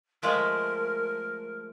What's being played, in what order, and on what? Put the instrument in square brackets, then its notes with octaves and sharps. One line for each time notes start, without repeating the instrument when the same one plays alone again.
[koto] F3 G#3 A3 [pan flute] A#4